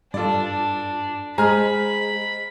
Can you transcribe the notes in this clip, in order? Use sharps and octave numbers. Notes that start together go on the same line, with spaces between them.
G2 D4 F4 A4 D5
G#3 C5 D#5 G#5 A#5 B5 F6